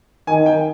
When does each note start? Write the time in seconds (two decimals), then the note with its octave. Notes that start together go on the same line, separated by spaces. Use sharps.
0.27 D#3 G#5
0.46 G5